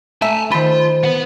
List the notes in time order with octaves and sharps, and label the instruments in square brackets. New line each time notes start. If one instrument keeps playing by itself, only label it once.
[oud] A3 [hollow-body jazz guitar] E5 [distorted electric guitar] G#5 A5
[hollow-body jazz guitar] D#3 B5 [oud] F3 [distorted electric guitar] F4
[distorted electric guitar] B4 F#5